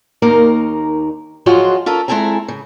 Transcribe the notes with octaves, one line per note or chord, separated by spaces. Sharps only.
D#2 A#3 D#4 A#4 A#5
F3 F#3 G#3 F4 F#4
C#4 F4 A4 A#4
G#3 C4 E4 A4 G#5 A#5
C#3